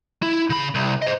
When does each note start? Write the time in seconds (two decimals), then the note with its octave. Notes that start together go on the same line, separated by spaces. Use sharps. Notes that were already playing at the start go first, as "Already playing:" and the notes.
0.23 E4
0.50 C#3 B5
0.75 C2
1.02 C5 D#5